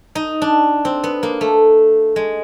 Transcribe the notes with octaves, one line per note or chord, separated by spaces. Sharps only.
D#4
D4
C4
B3
A#3
A3
G#3